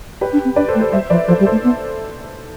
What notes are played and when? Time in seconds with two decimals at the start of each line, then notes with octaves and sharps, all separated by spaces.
0.21 G4 B4
0.33 D4
0.45 C4
0.56 D4 B4 D5
0.68 A4 C5
0.75 A3
0.81 A4 C5
0.92 G3 C5 E5
1.10 F3 B4 D5
1.28 F3 A4 C5
1.40 G3
1.46 A4 C5
1.52 A3
1.64 B3